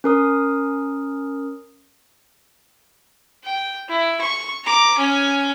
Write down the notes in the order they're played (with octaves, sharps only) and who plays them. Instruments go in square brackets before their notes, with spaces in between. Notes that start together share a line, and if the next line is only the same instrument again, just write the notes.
[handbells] C#4 A#4 D#6
[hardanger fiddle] G5
E4
C#6
A#5 D6
C#4 G#5